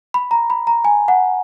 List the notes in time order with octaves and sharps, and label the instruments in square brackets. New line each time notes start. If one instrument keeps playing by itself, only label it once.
[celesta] B5
A#5
B5
A#5
G#5
F#5